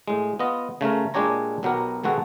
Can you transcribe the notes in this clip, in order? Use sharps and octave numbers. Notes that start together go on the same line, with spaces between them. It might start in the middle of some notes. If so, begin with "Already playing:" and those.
A2 G#3
B3 F4 D#5
C#3 A3 C#4 A#4
A#2 G#3 D4 G4 C#5 A#5
B1 B2 F#3 B3 G4 A#4
B2 D#3 G#3 F#4 A4